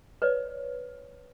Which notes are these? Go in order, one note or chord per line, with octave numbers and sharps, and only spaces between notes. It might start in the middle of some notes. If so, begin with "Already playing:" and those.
B4 C#5 D5